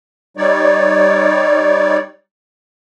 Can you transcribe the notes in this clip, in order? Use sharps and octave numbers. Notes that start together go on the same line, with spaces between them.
G3 D#4 C#5 D5